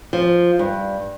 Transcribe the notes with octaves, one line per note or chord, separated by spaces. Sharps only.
F3
G2